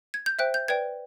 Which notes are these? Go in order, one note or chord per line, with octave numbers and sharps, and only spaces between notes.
G#6
G6
C5 E5 G5 F#6
G6
B4 D5 G5 G#6